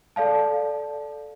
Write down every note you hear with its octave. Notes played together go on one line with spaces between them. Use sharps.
A4 D5 F5 A5